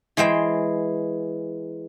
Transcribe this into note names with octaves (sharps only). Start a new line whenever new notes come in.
E3 G#3 C5 G5